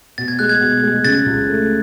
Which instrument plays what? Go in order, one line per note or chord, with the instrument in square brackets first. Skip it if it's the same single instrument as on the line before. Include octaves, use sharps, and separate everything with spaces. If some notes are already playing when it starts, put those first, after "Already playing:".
[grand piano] B2 [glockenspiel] A6
[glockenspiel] G#6
[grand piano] G#3 [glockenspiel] F#6
[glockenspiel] G#6
[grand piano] B2
G#3
[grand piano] C#3 [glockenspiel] A6
[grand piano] C#2
A3